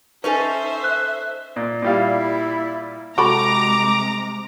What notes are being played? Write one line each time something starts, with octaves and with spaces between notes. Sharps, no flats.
C#4 D#4 A4 B4 C5 E5 G#5
F#6
A#2
A#2 G3 E4 F5
C3 G#3 F#4 A4 A#5 B5 D6